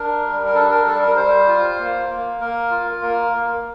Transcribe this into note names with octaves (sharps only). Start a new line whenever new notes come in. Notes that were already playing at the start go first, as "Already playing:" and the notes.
Already playing: D4 A#4
G3
A#4
D4 A4
A#4
G3 A4
A#4
G3 C5
F4
A#3
A#3
A#3 A#4
F4
A#3 A#4
A#3